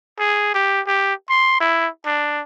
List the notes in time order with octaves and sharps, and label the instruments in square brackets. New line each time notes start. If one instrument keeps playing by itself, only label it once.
[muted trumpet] G#4
G4
G4
C6
E4
D4